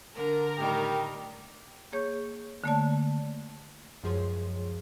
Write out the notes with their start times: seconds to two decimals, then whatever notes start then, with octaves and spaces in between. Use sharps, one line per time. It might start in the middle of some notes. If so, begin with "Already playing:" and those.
0.15 D3 A#4
0.58 A2 D#3 G3 G4
1.92 A#3 G#4 C#5 C#6 G6
2.64 D3 A3 A#3 C#5 D5 A5
4.03 C#2 F#2 F3 G#4 C#5 C6